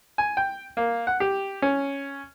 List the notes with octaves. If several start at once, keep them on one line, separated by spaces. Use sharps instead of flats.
G#5
G5
A#3
F#5
G4
C#4